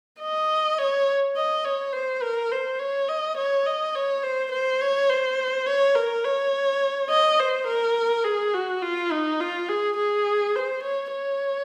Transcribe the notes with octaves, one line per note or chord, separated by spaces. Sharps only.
D#5
C#5
D#5
C#5
C5
A#4
C5
C#5
D#5
C#5
D#5
C#5
C5
C5
C#5
C5
C#5
A#4
C#5
D#5
C5
A#4
G#4
F#4
F4
D#4
F4
G#4
G#4
C5
C#5
C#5